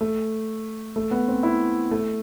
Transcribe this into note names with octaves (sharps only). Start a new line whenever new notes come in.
A3
A3
B3
C4
E4
A3